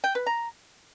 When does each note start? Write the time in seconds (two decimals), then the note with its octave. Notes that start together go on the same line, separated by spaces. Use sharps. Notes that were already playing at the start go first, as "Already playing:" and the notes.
0.04 G5
0.15 B4
0.26 A#5